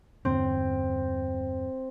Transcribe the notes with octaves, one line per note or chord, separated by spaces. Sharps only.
E2 G2 D3 C4